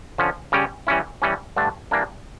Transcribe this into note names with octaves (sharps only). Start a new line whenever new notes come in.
D3 F3 C#4
C#3 G3 C#4 G4
E3 G3 C#4 E4
E3 G3 C#4
G2 D3 A3 D4
E3 G3 A#3 D4